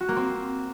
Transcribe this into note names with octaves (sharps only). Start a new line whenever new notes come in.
F#4
A#3
C4